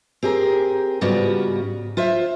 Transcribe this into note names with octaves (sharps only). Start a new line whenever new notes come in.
C4 G4 G#4 A#4
G#2 C#3 G3 B3 F4 F#4
F4 C5 E5